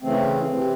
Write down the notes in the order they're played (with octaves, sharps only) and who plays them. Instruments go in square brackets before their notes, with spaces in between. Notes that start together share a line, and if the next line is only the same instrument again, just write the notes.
[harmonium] C#3 E3 A3 C4
C3 E3 C4